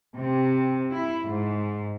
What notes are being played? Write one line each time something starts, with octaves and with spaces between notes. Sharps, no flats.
C3
E4
G#2